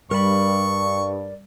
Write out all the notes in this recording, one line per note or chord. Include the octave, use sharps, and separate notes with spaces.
G2 G3 A#4 D5 B5 C#6